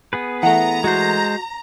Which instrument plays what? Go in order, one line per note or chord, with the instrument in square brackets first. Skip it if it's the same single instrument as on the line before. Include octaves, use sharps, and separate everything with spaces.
[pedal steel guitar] B3 G#4 B4
[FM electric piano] E3 A3 [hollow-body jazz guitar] F#5 [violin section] A#5
[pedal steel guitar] G#3 C5 [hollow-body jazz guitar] F#4